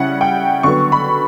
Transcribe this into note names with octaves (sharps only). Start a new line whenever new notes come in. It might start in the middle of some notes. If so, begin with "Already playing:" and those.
Already playing: C#3 G3 C#4 E4 F#5
G5
D3 F#3 B3 C#6
B5